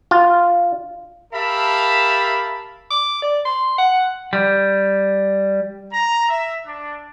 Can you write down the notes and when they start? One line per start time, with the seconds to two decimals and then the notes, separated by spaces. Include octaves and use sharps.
0.11 F4
1.33 G4 A#4 E5 F5 A5 B5
2.91 D6
3.22 D5
3.45 C6
3.79 F#5
4.33 G3
5.93 A#5
6.29 E5
6.64 D4